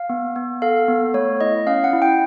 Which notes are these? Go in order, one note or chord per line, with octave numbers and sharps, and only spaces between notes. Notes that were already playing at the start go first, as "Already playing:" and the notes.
Already playing: F5
B3
B3
A4 F5
B3
A3 C#5
E4 D#5
C#4 F5
F#5
E4
G5